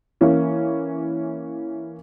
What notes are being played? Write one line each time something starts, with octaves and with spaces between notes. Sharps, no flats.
E3 A#3 C#4 E4